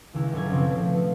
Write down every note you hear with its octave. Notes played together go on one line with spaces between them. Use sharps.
C#2 D#3 G#3 E4
F#1 B1 A4 C#5 G#6
C#3 F3 C4 C#4 E4
B2 C4
B2 A3
F3